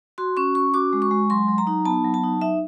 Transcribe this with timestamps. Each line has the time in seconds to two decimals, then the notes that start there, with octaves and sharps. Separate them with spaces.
0.18 F#4 C6
0.37 C#4 C#6
0.55 C#4 C#6
0.74 F#4 D6
0.93 G#3
1.02 C#6
1.11 G#3
1.30 F#3 C6
1.49 F#3
1.58 A#5
1.67 D#4
1.85 B3 A5
2.05 F#3
2.14 A5
2.24 D#4
2.42 D#4 E5